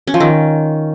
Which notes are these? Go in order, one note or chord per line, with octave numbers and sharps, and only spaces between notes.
C#4
F3
D#3